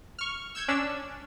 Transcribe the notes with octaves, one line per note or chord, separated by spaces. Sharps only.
C#6 F6
E6 G6 G#6 C#7
C#4 D4 E6